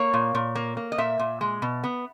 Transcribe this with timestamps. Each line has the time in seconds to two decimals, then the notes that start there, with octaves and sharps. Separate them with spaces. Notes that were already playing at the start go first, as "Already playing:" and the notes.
Already playing: A#3 C#5
0.14 A#2
0.35 A#2
0.55 A#3
0.77 A#3
0.92 D#5
0.98 A#2 E5
1.19 A#2
1.41 G#3
1.62 B2
1.84 B3